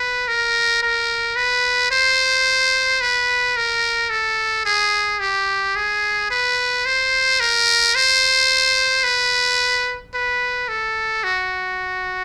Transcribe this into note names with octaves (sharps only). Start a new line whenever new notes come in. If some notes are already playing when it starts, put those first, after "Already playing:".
Already playing: B4
A#4
A#4
B4
C5
B4
A#4
A4
G#4
G4
G#4
B4
C5
A#4
C5
B4
B4
A4
F#4